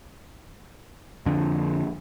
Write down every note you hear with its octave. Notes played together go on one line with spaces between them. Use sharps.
F2 D3